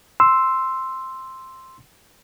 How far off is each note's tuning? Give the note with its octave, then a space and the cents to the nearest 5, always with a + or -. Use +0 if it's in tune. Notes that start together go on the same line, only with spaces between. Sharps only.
C6 +0 E6 +0